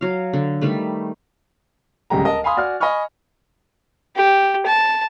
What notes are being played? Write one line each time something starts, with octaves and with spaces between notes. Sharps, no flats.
F#3 F5
D3
D#3 G3 A3 B4
D1 C#2 G3 G#3 G4 A#5
A#4 D#5 A5
F5 G#5 B5 C6 D#6
F#4 D5 G#5 F6
D#5 G#5 B5 C#6 F6
G4
A5